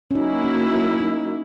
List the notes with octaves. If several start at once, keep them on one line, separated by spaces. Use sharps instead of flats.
C#4
F#3 A#3 D#4 E4
C#4
D#4